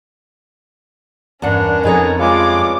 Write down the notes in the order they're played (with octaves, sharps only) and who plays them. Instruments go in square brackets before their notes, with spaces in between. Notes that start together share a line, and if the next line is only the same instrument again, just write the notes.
[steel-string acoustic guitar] E2 G2 [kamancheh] C#4 A#4 [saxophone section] D4 F#5
[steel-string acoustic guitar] F2 A4 C#5 [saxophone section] B3 D#4 G#4
[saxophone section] G2 C#3 G#3 [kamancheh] F4 D6